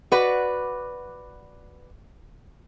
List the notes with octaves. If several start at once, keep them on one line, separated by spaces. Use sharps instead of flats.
F#4 B4 D5